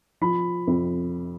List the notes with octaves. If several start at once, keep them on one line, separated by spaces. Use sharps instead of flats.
F3 B5
F2